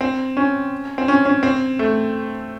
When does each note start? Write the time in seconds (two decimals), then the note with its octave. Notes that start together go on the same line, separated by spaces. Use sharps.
0.01 C4
0.37 C#4
0.98 C4
1.08 C#4
1.25 C#4
1.43 C4
1.79 A3